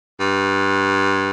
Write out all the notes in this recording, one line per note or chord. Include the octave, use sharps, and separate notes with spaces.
G2